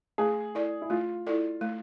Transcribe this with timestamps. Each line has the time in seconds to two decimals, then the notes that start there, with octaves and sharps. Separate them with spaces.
0.18 A3 G#4
0.55 E4 A4 D5
0.82 E4
0.90 A3 F4
1.27 E4 A4 D5
1.61 A3